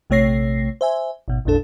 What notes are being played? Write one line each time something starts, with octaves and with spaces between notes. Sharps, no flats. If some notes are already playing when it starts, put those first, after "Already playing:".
A#1 C3 A3 C#5 A#6 C7
C5 E5 G#5
G#1 B2
A1 E2 A#2 D4 A4